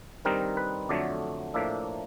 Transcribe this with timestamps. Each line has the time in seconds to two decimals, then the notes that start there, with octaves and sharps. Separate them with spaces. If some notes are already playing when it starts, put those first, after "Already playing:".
0.25 G2 D#3 G3 C4 D#4 A#4
0.57 B4
0.89 F2 D3 F#3 A3 D5
1.54 A2 F3 A#3 D4 E5